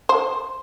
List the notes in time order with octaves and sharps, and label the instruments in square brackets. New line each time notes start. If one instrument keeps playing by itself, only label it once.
[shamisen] C5